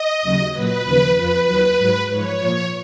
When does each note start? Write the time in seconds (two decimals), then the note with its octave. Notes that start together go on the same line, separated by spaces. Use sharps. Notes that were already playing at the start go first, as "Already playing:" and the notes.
Already playing: D#5
0.22 D#2 C#3 F#3
0.53 A#2 F#3 B4
0.84 D#2 C#3 F3
1.15 F2 F3 B4
1.46 D#2 D#3 F#3
1.77 G#2 F#3
2.09 G#2 F3 C#5
2.39 A#2 F3